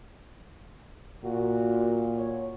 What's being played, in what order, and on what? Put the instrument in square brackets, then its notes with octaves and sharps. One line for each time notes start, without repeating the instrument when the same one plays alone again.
[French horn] A#2 [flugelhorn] F#4
[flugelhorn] C#5